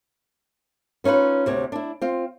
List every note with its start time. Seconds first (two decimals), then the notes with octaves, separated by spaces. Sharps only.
1.04 B3 C#4 D#4 F4 B4
1.46 D2 C3 C#5
1.72 D4 E4
2.02 C4 F4